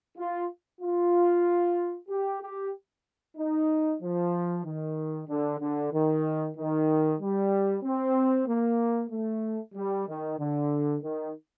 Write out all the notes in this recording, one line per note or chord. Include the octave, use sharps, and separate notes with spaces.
F4
F4
G4
G4
D#4
F3
D#3
D3
D3
D#3
D#3
G3
C4
A#3
A3
G3
D#3
D3
D#3